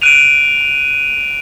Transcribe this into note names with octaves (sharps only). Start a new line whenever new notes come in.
F#6 D7 D#7 F7